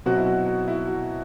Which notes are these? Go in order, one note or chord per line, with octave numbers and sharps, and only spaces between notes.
B2 F#3 C4 F#4
E4
F#4
F#4
E4
F#4